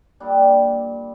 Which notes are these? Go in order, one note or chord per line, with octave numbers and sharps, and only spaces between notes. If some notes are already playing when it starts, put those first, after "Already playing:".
A#2 G3 D4